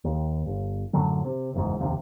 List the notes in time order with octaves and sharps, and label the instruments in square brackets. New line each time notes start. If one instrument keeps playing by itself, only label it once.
[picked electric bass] D#2
G1
F#2 A2 D3 F#3
C3
F#1 E2 G#2
F1 A#1 D#2 C3